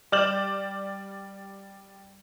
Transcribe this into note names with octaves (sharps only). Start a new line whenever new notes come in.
G3 D5 F6 G6 E7 F#7